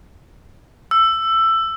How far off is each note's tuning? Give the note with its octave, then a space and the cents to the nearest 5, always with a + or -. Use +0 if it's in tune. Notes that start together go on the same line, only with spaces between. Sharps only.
E6 +15